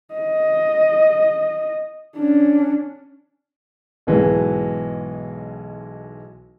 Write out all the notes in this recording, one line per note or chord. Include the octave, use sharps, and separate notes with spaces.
D#5
C#4 D4
B1 G#2 E3 F#3 G#3